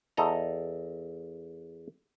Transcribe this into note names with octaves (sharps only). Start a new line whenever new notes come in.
E2 A4 D#5 A#5